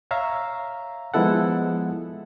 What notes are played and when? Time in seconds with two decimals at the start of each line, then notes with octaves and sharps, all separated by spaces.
0.11 C#5 E5 F5 A#5
1.14 F3 G#3 B3 E4 A4 F#5